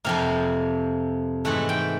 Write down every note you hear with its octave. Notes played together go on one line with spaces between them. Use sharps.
F2 C3 F3 A#3 F5
G#2 E3 A3 F#5
G5